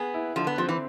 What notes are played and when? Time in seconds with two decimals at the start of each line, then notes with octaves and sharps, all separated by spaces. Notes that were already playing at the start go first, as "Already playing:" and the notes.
Already playing: B3 G#4
0.14 E4
0.36 D3 F3
0.47 B3
0.58 F3 C4
0.69 E3